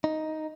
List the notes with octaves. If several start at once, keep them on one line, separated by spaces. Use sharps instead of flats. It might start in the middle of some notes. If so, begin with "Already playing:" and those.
D#4